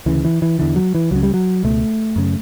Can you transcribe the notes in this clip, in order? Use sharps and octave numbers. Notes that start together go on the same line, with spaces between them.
D2 C#3 E3
E3
E3
E2 D3 E3
F#3
E3
C#2 C#3 F#3
G3
F#3
C#2 B2 A3
F#2 C#3